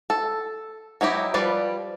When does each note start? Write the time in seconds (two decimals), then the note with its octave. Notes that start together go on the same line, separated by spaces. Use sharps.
0.10 A4
1.01 F#3 D#4 E4 G4
1.34 F3 G3 B4 D5